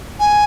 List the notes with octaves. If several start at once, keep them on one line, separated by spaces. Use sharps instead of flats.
G#5